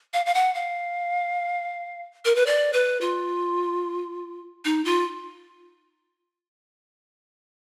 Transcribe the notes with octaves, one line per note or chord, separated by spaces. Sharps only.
F5
F5
F#5
F5
A#4
B4
D5
B4
F4
D#4
F4